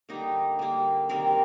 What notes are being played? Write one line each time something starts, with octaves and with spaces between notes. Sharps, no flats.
D3 G3 A#3 D#4
D3 G3 A#3
C3 D#3 G3 A#4